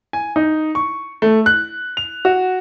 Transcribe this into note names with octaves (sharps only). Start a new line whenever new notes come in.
G#5
D#4
C#6
A3
F#6
F7
F#4